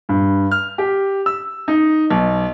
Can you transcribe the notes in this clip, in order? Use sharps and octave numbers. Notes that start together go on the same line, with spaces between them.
G2
F6
G4
E6
D#4
B1